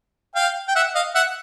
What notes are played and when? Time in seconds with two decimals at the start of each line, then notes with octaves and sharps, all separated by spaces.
0.35 F5 G5
0.68 G5
0.75 E5 F#5
0.95 D#5 F5
1.15 E5 F#5